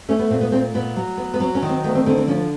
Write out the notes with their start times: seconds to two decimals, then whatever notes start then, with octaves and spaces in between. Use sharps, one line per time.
0.09 A3 C#4
0.19 B3
0.30 A#2 C4
0.41 B3
0.52 A#2 C4
0.74 A#2 B3
0.96 F#3
1.18 B3
1.34 B3
1.40 F#3 C4
1.55 C#4
1.62 D#3
1.69 C4
1.84 D2 B3
1.95 C4
2.06 D3 C4
2.17 C4
2.28 F3 C#4